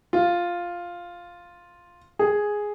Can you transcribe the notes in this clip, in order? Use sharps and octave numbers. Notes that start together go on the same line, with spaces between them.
F4
G#4